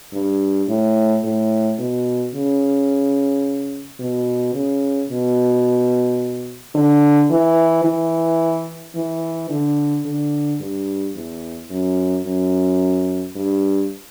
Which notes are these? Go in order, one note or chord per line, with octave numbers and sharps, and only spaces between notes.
G2
A2
A2
B2
C#3
B2
C#3
B2
D3
E3
E3
E3
D3
D3
G2
E2
F#2
F#2
G2